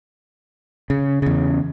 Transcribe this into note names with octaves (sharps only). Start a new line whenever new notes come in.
C#3
E2 C#3